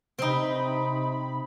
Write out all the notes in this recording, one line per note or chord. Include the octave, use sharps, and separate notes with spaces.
C3 C4 D#4 B5